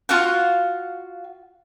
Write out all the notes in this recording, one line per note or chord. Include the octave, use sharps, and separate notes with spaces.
F4 F#4 F5 F#5